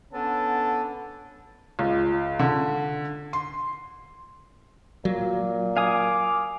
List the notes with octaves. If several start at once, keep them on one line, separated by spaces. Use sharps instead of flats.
D3 B3 C#4 A5
C#2
D3
C6
A#2 F#3
F5 G#5 D6 D#6